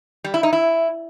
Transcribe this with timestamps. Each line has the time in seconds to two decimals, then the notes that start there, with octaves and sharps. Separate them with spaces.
0.24 G3
0.34 E4
0.43 D#4
0.53 E4